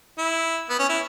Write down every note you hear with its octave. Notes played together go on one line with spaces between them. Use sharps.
E4
B3
C#4
E4